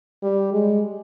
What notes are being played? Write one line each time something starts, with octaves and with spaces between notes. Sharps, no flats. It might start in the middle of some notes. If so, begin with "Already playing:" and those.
G3
G#3